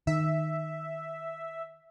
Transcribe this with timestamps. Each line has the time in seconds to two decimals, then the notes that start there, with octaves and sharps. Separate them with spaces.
0.07 D#3 E5